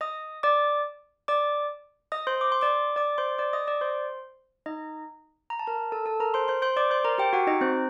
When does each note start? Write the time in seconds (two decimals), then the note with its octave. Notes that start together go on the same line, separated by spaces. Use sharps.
0.01 D#5 D#6
0.43 D5 D6
1.28 D5 D6
2.12 D#5 D#6
2.27 C5 C6
2.41 D6
2.52 C6
2.61 D5 D6
2.96 D5 D6
3.18 C5 C6
3.38 D5 D6
3.53 D#5 D#6
3.67 D5 D6
3.81 C5 C6
4.66 D#4 D#5
5.50 A#5
5.59 A5
5.67 A#4 A#5
5.92 A4 A5
6.06 A4 A5
6.20 A#4 A#5
6.34 C5 C6
6.48 C5 C6
6.62 C5 C6
6.77 D5 D6
6.91 C5 C6
7.05 A#4 A#5
7.18 G4 G5
7.33 F#4 F#5
7.47 D#4 D#5
7.61 C4 C5